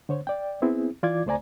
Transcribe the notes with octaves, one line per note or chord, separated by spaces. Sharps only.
D3 C5 C#5
D5 G5
B3 C4 E4 G#4
E3 F4 D5 D6 G#6
C#2 A3 C5 D5 G#5 A#5